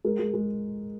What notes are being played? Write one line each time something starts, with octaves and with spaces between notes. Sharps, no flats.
G#3 A#4
G#3
G#3